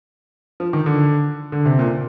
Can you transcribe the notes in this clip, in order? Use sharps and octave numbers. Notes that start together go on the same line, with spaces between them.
F3
D#3
D3
D3
C3
A#2